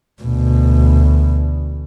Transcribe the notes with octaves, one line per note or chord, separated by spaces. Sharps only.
D2 B2